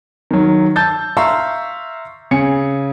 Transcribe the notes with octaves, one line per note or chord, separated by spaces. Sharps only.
D#3 F#3
A5 E6 G6 A6
E5 F5 A#5 C6 C#6 E6
C#3 G#5 C#7